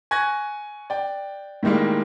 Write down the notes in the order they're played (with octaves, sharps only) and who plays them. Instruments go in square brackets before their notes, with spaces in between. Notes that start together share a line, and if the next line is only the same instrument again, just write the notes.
[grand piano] G#5 C#6 F#6 G#6 A#6
D5 G5
A2 D#3 G3 G#3 A#3